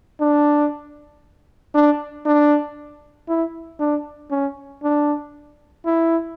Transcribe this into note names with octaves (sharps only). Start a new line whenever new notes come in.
D4
D4
D4
E4
D4
C#4
D4
E4